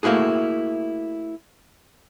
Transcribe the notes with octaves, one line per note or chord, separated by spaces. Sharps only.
A3 A#3 E4 F#4 G#4